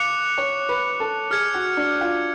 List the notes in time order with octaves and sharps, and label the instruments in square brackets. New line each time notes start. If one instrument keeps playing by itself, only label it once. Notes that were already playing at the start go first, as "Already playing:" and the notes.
Already playing: [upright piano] F5 [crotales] D6 F#6 C#7 F7
[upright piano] C#5
B4
A4
[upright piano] G#4 [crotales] F6 G#6 C#7
[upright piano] F#4
D4
F4